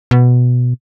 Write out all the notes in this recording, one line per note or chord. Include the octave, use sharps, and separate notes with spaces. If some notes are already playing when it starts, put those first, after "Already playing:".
B2